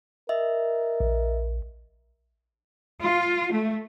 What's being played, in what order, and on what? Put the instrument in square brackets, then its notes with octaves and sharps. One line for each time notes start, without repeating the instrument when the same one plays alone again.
[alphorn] A#4 [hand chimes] D#5 E5
[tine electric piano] A#1
[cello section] F4
A3